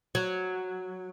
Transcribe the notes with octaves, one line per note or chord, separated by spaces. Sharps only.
F#3